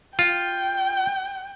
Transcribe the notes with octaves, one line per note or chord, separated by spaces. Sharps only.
F4 G5